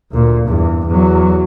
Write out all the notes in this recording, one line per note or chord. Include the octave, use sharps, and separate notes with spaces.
D2 A#2
E2 G2
E2 F#3